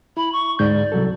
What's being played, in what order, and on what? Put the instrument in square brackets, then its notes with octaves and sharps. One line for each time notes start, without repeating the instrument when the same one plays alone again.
[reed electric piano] E4 [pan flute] B5
[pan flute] C#6
[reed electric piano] D2 G#2 G6 [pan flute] D5
[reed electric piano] C2 F#3 A4